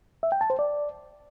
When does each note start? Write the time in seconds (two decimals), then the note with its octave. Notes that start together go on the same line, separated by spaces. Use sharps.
0.23 E5
0.32 G5
0.41 A5
0.50 C5
0.59 D5